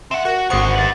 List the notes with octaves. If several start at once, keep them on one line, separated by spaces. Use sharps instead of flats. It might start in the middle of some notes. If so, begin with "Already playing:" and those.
C4 E5 F#5 E7
F#4 A#4 F#5
G#1 D3 F#4 C5 D#6 C7 C#7
G4 B4 A6 F#7